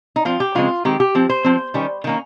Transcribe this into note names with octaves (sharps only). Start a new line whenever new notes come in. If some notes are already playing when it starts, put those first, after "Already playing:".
D#4
F3 C4 F4
G4
C#3 F3 G#3 C4 F4
D#3 G#3 C4 G4
G4
F3 C4
C5
F3 C4
D#3 G3 C#4
D#3 A#3 C#4